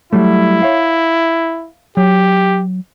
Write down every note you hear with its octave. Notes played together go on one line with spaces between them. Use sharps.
F#3 G3 A3 E4
C#5 E5 F5
F#3 G4